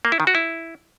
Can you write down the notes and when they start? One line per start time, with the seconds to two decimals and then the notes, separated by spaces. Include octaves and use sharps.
0.05 A#3
0.12 E4
0.20 D#3
0.27 F#4
0.35 E4